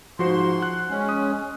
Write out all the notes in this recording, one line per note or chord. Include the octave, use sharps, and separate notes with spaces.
G#2 F3 F#4 C5 C6
F#5 F#6
G#3 C#4
D#6 F#6